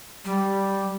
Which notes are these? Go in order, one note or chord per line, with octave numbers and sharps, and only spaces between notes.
G3